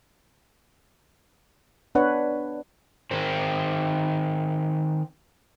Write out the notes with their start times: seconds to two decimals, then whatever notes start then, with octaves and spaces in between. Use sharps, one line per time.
1.95 B3 D4 B4 C#5 F#5
3.11 D#3 C4